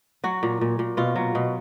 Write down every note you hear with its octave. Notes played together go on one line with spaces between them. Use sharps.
F#3 F#4
A#2
A#2
A#2
B2 F4
F#3
B2